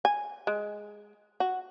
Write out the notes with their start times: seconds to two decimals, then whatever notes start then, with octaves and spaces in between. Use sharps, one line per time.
0.05 G#5
0.47 G#3
1.40 F#4